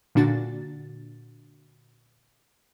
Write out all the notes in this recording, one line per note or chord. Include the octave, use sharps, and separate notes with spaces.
A#2 D3 D4 F#4 A6